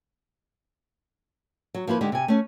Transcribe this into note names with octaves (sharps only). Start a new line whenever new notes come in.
F#3
F3 A#3 E4 B4
D3 G#3 D#4 G4
C3 G#5
A3 C#4